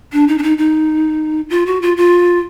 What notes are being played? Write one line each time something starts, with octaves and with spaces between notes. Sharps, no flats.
D4
D#4
D4
D#4
D#4
F4
F#4
F4
F4